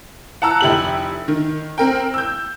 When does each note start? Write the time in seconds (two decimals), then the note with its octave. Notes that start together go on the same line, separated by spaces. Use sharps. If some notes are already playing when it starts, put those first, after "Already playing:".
0.42 F#5 A5 A#5 E6 F#6
0.61 F1 E4 G4 F#7
1.28 D#3
1.78 C4 A#4 G5
2.14 E6 G6